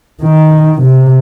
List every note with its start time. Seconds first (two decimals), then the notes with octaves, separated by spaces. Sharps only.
0.23 D#3
0.81 C3